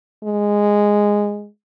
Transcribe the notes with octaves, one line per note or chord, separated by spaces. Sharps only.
G#3